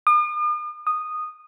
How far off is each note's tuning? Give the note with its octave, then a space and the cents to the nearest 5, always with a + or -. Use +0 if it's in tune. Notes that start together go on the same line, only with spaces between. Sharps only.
D#6 -45
D#6 -10